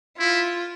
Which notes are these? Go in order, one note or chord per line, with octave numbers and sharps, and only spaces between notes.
E4 F4